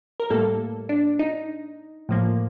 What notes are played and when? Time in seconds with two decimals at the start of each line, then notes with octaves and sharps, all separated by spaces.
0.20 A#4
0.30 A2 G3 A#3 A4
0.89 D4
1.19 D#4
2.09 A2 F3 A#3